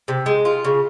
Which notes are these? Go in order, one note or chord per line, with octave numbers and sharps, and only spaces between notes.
C3
G#3
F4
C#3